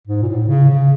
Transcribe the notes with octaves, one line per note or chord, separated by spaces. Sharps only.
G#2
A#2
A2
C#3
C#3